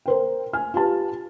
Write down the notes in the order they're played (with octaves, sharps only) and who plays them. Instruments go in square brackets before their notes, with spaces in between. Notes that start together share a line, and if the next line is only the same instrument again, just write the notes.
[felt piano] A#4 C5 G5
G#5 F6
F4 G4 B4 A5